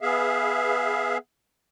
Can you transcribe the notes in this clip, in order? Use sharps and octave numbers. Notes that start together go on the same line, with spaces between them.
B3 G#4 E5 F5